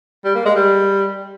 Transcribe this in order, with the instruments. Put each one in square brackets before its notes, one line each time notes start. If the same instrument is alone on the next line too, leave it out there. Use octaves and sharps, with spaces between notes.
[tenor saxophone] G3
A#3
G#3
G3